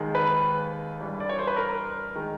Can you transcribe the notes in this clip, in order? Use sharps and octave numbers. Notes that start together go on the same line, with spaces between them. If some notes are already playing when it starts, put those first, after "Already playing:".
Already playing: D#2 D#3 G#3
B4
G2 E3 G3
D5
C#5
C5
B4
A#4
D#3 G#3